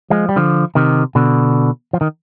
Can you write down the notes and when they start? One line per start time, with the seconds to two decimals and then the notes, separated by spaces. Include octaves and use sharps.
0.10 F3 G#3
0.29 G3
0.36 D3 F3
0.75 C3 D#3
1.15 B2 D3
1.93 F3
2.01 D#3